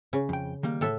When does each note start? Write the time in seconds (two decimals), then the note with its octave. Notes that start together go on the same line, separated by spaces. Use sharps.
0.13 C#3
0.29 F2 G5
0.63 D#3 G3 A#3
0.81 A2 A4 E5